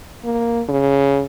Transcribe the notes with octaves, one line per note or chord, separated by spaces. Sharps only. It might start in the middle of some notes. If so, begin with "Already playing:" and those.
A#3
C#3